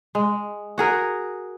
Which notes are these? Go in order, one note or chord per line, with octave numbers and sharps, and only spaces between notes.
G#3
F#4 G#4 A#4